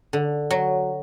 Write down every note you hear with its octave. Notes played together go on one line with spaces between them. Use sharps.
D3
F#3